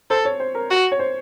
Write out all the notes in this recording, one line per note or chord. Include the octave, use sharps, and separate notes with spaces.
A4 C5
C#5
C5
A#4
F#4
C#5
C5